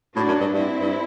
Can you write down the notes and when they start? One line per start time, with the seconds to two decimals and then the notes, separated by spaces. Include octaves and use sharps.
0.16 A2 D4 F#4
0.28 F#2
0.40 G2
0.53 G2 C4 E4
0.81 G2